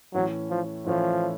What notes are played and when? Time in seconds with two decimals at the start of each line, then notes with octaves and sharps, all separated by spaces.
0.14 A2 E3 F#3 A3 C#4 E4
0.50 F3
0.86 A2 E3 F3 A3 C#4 E4